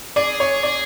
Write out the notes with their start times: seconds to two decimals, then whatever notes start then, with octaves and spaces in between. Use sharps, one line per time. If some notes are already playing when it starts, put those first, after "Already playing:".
0.16 G#4 D5
0.40 C#5
0.63 D5